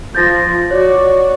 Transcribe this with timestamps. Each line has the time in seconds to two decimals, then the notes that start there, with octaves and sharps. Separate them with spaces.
0.15 F3 G6 A6 A#6
0.71 F#4 C#5 D5